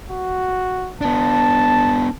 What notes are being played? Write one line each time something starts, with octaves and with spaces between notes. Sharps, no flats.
F#4
B3 D4 A5